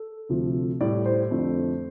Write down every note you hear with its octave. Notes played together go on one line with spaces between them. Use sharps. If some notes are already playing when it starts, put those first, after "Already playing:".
Already playing: A4
D2 C3 F3 A3
A2 G3 D5
C5
F2 D3 F3 A3